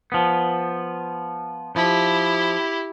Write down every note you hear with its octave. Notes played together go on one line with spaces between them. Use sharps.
F3 B3
F3 E4 G4